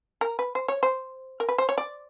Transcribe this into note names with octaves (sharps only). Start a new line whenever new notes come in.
A#4
B4
C5
C#5
C5
A#4
B4
C5
C#5
D5